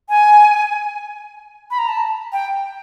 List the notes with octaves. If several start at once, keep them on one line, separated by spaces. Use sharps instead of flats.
G#5
B5
A#5
A5
G5